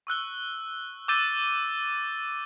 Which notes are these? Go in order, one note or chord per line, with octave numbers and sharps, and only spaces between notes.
C#6 E6 F#6 G7
D6 E6 G6 A6 D#7 G7